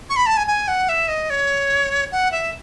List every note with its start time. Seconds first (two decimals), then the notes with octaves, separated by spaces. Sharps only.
0.10 C#6
0.16 B5
0.26 A5
0.37 G#5
0.47 G#5
0.68 F#5
0.89 E5
1.08 D#5
1.30 C#5
2.12 F#5
2.32 E5